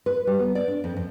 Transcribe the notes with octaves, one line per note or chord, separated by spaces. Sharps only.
B4
G3
B3
D5
D4
F2
F2